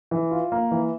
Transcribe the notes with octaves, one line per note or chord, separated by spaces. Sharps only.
E3
F4
A#3
E3